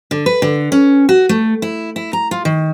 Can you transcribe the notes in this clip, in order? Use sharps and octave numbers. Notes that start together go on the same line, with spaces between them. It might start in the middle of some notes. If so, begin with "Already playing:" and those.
D3
B4
D3
C#4
F#4
A3
E4
E4
A#5
F4
D#3